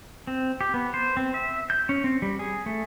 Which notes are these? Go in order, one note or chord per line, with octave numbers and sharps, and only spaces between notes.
C4
G4
B3
C5
C4
E5
G6
C#4
C4
G3
G#4
A3